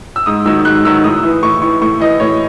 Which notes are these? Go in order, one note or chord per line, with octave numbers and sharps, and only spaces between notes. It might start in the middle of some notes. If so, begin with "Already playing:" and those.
E6
G#2 D#6
D#3 F#3 E6
G#2 F#6
D#3 F#3 E6
A2 D#6
E3
A2 C#6
E3 C#6
A2 C#6
E3 D#5
A2 C#5